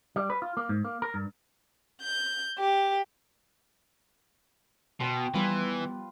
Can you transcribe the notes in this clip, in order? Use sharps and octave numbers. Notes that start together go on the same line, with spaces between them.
G3
B4
F4
A#3
G#2
A#3
A#4
G2
G6
G4
B2 G5 C6
E3 F3 G3 B3 F4 B4